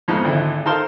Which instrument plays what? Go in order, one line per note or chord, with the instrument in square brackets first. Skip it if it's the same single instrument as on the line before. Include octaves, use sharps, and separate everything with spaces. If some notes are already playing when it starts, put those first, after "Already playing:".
[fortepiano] F2 G#2 F3 B3 C4 D#4
G#1 D2 E4
D#4 A4 A#4 C5 F5 C6